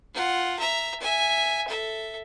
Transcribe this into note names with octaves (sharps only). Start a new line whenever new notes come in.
F4 F#5
E5 A#5
E5 G#5
A4 E5